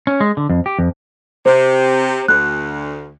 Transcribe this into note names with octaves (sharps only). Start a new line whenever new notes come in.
C#4
G#3
D3
F2
G4
F2
C3 C5
D2 F#6